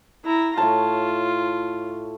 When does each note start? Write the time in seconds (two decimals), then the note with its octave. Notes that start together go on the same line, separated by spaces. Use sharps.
0.24 E4 A#5
0.57 A2 F4 C#5 A5